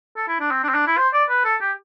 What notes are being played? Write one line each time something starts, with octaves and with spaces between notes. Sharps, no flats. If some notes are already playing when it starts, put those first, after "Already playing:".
A4
E4
D4
C4
D4
C4
D4
E4
C5
D5
B4
A4
G4